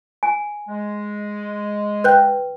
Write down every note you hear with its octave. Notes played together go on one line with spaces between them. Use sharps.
G#5
G#3
B4 G5 F#6 G6